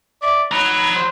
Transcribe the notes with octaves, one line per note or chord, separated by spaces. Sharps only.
D5 E5
D#4 C#5 A#5 B5
C5